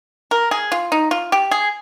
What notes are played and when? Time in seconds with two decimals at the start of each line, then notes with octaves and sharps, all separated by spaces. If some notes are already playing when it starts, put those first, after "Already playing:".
0.31 A#4
0.51 G#4
0.72 F4
0.92 D#4
1.11 F4
1.32 G4
1.51 G#4